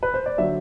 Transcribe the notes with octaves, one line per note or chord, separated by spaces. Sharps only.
B4
C5
D5
D3 F#3 E5